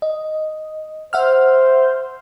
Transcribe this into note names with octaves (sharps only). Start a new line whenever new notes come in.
D#5
C5 E5 F#5 F6